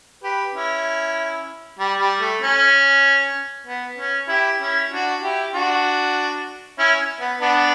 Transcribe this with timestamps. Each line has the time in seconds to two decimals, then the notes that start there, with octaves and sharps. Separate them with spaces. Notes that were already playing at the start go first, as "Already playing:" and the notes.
0.23 G4 B4
0.54 C#4 E4
1.79 G3
2.00 G3
2.21 A3
2.42 C#4
3.67 B3
3.98 C#4
4.29 E4 G4
4.60 C#4 E4
4.91 D4 F#4
5.22 E4 G4
5.53 D4 F#4
6.79 C#4 E4
7.20 B3
7.41 B3 D4